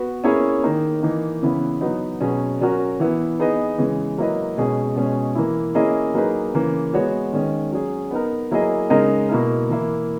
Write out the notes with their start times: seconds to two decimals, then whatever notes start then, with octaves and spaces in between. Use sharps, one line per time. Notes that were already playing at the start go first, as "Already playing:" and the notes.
Already playing: B3 F#4 B4
0.24 A#3 C#4 E4 G#4 C#5
0.63 D#3 A#3 D#4
1.03 E3 A#3 D#4
1.42 C#3 E3 B3 E4 B4
1.81 F#3 B3 D#4
2.21 B2 F#3 C#4 G#4
2.61 F#3 C#4 F#4 A#4
2.99 E3 B3 E4
3.39 B3 D#4 G#4 B4 D#5
3.78 C#3 E3 G#3
4.18 F#3 A#3 E4 B4 D#5
4.57 B2 G#3 C#4 G#4
4.96 B2 G#3 C#4 G#4
5.35 E3 A#3 E4
5.75 A#3 C#4 E4 G#4 D#5
6.14 F#3 A#3 D#4 G#4 B4
6.54 C#3 E3 A#3
6.93 G#3 B3 F#4 C#5
7.33 D#3 G#3 C#4
7.72 F#3 C#4 G#4
8.11 B3 D#4 A#4
8.51 F#3 A#3 E4 G#4 D#5
8.90 C#3 G#3 D#4 A#4 D#5
9.29 B2 A#3 E4 A#4
9.69 E3 A#3 E4